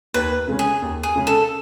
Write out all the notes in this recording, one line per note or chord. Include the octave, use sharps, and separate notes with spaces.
D#2 B4
C#3 G#3 C#4
G#4
D#2
G#4
C#3 G#3 C#4
A4